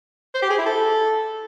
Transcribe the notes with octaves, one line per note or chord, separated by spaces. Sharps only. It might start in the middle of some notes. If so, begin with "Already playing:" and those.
C5
G4
G#4
E4
A4